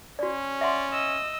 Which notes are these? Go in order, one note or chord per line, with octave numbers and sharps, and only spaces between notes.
C#4 F#4 D5
D5 E5 F#5 C6
D#5 E6